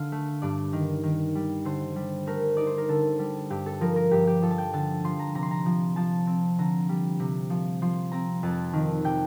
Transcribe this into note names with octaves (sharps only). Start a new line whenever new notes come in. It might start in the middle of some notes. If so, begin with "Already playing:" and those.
Already playing: D3 F5
A3
G2 D5
D#3
D#3
G3
D3 C5
G3
A3 A#4
D#4 D5
C5
A#4
D3 A4
G3
G2 G4
A4
F3 A#4
A#4
G2 G4
G4
F3 A4
A5
G5
D3 A5
F3 C6
A#5
C3 A#5
C6
A#5
F3
F3 A5
C4
D3 A#5
G3
C3
F3
F3 C6
C4 A#5
F2 A5
D#3
C3 G5